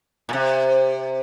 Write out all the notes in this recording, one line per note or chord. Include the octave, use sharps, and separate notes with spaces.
A#2
C3